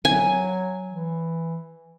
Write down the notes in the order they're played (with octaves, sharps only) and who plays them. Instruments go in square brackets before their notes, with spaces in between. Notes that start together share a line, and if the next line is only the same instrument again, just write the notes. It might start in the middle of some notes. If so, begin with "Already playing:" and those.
[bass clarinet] F#3 [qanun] G#5
[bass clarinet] E3